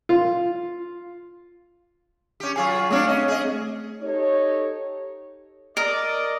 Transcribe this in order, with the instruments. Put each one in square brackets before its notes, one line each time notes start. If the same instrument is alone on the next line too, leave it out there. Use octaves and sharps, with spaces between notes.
[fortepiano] F4
[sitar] C#4 G4
[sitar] F#3 F4 G#4 [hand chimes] G#5 C#6
[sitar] F#3 D4 C#5 [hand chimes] A3 C4 F6
[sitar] C#4 D#5
G#4 D#5
[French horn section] D#4 G4 A4 C#5
[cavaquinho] A#4 [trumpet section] D5 D#5